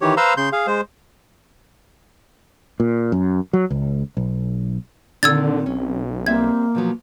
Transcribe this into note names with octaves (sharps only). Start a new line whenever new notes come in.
D#3 E3 G4 C#5
B4 C5 F5 A#5 C6 E6
C#3 C6 G6
G#4 F5
G#3 C5
A#2
F#2
F#3
C#2
B1
A#2 D3 D#3 C4 E6 G#6 A6
B1 C#4
G3 A#3 C4 E5 G#6
B2 F3 F#3